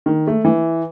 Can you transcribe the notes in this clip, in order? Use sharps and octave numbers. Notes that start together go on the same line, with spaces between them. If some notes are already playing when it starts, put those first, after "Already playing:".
D#3
A3
E3